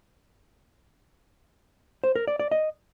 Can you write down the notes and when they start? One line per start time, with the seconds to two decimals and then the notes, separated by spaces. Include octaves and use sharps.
2.04 C5
2.16 A#4
2.28 D5
2.40 D5
2.51 D#5